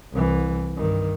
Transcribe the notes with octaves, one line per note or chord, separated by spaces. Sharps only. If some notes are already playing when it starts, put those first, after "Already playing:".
C2 E3
G2 D#3